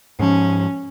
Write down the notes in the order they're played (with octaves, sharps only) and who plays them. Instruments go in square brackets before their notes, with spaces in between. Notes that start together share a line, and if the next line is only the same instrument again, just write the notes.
[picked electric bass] G#2 F3 [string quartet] C#4